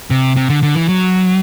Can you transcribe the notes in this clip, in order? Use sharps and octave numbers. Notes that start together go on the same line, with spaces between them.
C3
C3
D3
D3
E3
F#3